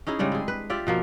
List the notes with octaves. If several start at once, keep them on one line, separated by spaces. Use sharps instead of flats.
C#4 D#4 E4 G#4
C#3 G3 G#3 D4
C4 G#4
B4
F4 G4 D5 E5
B2 F3 A#3 C4